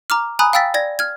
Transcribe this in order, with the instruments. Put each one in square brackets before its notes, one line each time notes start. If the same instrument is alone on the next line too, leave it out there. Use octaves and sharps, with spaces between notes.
[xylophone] A#5 D6 F6
G#5 A#5 B5 D#6 F#6
F5 G5 E6 A6 B6
D5 G#6 A#6
F6 G#6